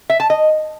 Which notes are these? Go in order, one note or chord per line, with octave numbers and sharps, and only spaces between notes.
E5
A5
D#5